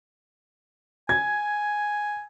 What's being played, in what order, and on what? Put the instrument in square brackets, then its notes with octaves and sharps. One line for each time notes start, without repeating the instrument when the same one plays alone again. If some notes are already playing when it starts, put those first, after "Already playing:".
[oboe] G#5 [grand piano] G#6